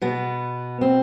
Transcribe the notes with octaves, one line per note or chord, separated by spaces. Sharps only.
B2 B3
C4